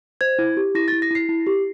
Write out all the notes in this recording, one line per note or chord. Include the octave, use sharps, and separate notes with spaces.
C5 G#6
E4
G4
E4 A#6
A6
E4
A#6
E4 C7
E4
G4